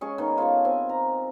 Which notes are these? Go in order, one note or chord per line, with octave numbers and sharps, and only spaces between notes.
G#3 C#4 G#4 C#6
D#3 B3
F4 G#4 A4 C#5
C4 G#5
A#5